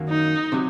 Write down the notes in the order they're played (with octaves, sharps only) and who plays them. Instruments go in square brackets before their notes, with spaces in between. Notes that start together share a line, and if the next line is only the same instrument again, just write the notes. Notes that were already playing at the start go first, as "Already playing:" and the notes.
Already playing: [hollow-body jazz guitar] F#2 D#3 F#3 A#3
[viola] D#4
[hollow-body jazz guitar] C3 F#3